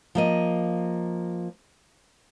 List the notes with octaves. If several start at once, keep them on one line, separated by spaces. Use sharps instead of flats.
F3 A#3 D#5